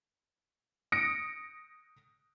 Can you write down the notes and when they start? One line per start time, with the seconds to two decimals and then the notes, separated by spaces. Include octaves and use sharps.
0.92 D#6 A#6 C#7 D7